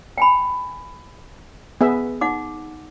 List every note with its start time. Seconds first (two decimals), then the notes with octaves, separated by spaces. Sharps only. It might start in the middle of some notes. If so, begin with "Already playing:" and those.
0.18 G5 G#5 B5
1.81 B3 G#4 E5
2.21 D#4 F#5 D6